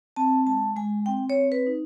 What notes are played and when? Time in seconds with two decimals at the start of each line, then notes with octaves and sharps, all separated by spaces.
0.16 C4 A5
0.46 G#3 A5
0.76 G#3 G#5
1.06 C4 G5
1.30 C#5
1.36 C4
1.52 B4
1.67 D#4